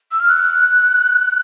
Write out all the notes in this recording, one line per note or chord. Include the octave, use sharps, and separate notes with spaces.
E6
F6
F#6